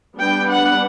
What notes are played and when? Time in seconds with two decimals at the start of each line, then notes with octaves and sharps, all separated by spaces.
0.18 G3 B3 D4 G5
0.49 F#5